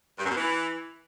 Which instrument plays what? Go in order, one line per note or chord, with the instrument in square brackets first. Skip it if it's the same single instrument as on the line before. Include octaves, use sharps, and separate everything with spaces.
[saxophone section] G2
F#2
B2
E3